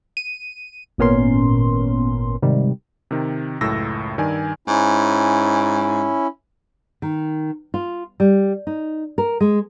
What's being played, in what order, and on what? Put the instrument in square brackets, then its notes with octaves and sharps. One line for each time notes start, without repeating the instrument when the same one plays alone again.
[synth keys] D#7
G#1 A#2 B3 C#4 A#4 C6
G#2 C3 D#3 G3
[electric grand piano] C3 D#3
C#2 F#2 A2 A4 E6 A#6
G2 D#3 D5 G#5
[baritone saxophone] G#2 [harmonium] C#4 E4
[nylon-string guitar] D#3
F4
G3
D#4
A#4
G#3